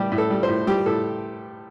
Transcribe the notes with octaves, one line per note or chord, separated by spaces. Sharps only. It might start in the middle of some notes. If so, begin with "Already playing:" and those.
Already playing: A2 G3 G4
A2
A4
G3
C5
A2
G3 G4
A2 A4